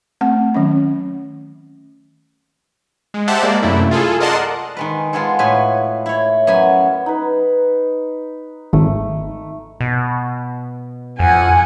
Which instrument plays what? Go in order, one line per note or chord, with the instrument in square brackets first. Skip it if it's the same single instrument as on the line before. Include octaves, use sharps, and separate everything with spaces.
[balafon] A3 C4 F#5
D#3 F#3 C#4
[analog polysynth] G#3
G4 C5 E5 F#5 A5
G#3 A#3 D5
F#2 C3 A3 E4
F4 G#4 A4
A#4 D5 D#5 F#5 A5 C6
[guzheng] D#3 G#3 B4
G#3 B3 F4 G#4 A4
A2 B4 G#5
E4 C#5
F#2 B3 G#5 B5
[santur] D#4 B4
[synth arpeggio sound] G#1 [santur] A3
[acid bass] B2
[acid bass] F2 [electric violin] F#5 G#5